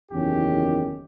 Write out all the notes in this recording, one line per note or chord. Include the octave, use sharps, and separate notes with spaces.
F#1 E2 D#3 C#4 G4